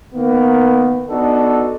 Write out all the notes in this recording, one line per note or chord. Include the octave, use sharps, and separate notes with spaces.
D#3 A#3 B3
B3 D4 D#4 F#4 A4